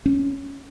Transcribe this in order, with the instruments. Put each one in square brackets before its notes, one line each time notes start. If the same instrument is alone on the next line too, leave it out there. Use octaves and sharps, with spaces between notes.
[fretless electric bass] C#4